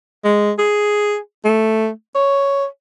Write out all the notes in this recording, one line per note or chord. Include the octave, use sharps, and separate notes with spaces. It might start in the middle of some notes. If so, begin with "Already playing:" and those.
G#3
G#4
A3
C#5